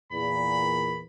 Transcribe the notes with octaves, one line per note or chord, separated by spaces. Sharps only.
E2 A#2 B5